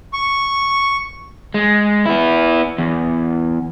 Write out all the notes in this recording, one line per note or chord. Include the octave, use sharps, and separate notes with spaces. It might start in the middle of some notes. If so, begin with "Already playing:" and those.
C#6
G#3
B3 E4
E2